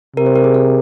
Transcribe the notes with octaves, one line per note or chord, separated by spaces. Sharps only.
C3 A#4
C5
A#4
G#4
A#4